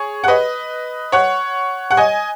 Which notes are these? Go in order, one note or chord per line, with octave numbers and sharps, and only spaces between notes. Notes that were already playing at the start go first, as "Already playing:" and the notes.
Already playing: G#4 C#5
F#5
B4 D#5
C#5 F#5
F#5
D#5 G#5